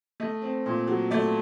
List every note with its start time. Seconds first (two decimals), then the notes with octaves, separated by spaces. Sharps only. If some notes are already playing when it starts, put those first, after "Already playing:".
0.20 A3 D#5
0.42 C4
0.66 A#2
0.88 F#3
1.11 A3 D5